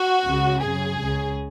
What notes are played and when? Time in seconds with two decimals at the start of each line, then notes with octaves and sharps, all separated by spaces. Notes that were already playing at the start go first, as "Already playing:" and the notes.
Already playing: F#4
0.25 C#2 C#3
0.62 F#2 C#3 G#4
1.00 C#2 C#3